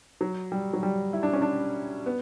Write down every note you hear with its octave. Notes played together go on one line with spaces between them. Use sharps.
F#3
G3
F#3
G3
E4
D4
C#4
D4
B3